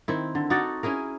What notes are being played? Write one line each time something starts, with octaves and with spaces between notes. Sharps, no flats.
D#3 C4 E4
D3
D#4 F#4 A4 D5
C#4 E4 G#4 A#4